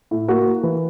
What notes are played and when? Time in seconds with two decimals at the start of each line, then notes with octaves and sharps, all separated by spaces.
0.11 A2
0.28 A#3 F#4
0.46 A#3
0.63 E3